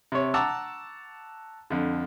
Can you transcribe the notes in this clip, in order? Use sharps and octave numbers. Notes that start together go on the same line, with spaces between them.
C3 C#5
F#5 A5 A#5 C#6 D6 E6
F2 D3